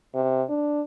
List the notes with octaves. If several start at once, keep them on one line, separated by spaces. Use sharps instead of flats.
C3
D4